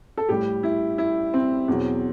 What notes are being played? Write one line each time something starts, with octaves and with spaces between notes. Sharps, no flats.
A4
A2 G3 G4
E4
E4
C4
E2 B2 F#3